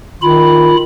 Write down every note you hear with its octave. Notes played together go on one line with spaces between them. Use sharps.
D#3 F4 B5